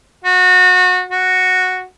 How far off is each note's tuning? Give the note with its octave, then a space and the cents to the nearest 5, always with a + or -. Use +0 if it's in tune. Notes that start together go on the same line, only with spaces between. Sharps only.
F#4 -25
F#4 -5